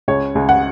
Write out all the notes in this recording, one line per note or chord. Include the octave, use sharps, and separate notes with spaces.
C#2 C#5
C#2
F#5